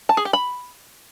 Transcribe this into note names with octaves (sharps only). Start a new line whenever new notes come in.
A5
G#4
G4
B5